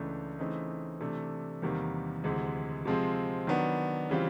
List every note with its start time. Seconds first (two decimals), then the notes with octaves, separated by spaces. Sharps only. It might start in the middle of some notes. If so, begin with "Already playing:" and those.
Already playing: C#2 C#3 E3 A3 D4
0.39 C#3 E3 A3 C4 D#4
1.01 C3 E3 A3 D4
1.62 E2 C3 D#3 G3 A#3
2.24 D2 C3 E3 G#3
2.85 C3 F3 G#3 C4 F4
3.47 D#3 F#3 B3 D4
4.10 C#3 E3 G3 C4 F4